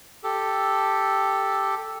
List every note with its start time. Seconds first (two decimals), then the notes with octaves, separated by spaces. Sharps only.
0.23 G4 A4